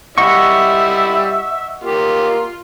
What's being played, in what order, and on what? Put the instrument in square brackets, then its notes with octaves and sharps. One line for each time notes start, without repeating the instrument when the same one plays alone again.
[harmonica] G3 E4 [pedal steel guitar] D#5 F#5 C#6 [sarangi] E5
[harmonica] A#3 G4 [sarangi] F4